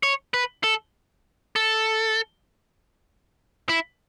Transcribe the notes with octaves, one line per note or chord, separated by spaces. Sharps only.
C#5
B4
A4
A4
E4